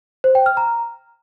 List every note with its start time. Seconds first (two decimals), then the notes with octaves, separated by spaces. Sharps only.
0.24 C5
0.35 G5
0.46 F6
0.57 A#5